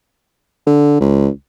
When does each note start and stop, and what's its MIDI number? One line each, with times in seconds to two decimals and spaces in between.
0.67 0.99 50
1.00 1.29 37